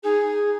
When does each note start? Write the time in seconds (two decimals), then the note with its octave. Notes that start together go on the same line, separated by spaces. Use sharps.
0.03 D#4 G#4